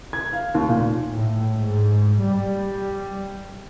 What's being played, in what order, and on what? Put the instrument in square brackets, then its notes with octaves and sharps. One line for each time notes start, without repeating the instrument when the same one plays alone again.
[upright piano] G#6
F5
D#2
A#2
[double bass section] A2
G#2
G3